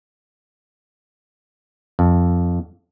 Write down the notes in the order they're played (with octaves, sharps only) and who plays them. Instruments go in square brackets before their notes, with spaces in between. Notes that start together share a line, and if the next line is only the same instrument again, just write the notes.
[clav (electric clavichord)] F2